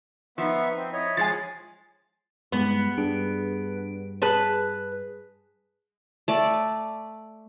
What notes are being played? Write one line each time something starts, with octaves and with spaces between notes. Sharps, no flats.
F3 B3 D#4 E5 C#6
C4
E4 C#5 D#5
F3 G#3 C#5 G#5 A6
G2 G#3 B3
G2 D4 G#4 D7
G#4 B4 A5
A3 D5